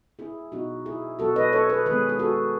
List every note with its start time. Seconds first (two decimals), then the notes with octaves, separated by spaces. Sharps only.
0.19 E4 G#4
0.52 B2 F#3 B3 D#4 F#4
0.86 E4 G#4
1.19 B2 F#3 B3 F#4 A4
1.36 B4 D#5
1.53 A4 C#5
1.70 G#4 B4
1.86 D#3 G#3 B3 G#4 B4
2.09 G#4
2.19 F#4 A4